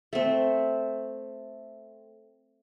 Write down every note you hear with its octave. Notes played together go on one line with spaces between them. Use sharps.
A3 C4